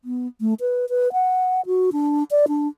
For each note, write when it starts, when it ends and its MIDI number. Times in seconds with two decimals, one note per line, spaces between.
0.04 0.27 59
0.41 0.54 57
0.60 0.85 71
0.89 1.12 71
1.13 1.61 78
1.66 1.90 66
1.92 2.24 62
2.31 2.46 74
2.48 2.68 62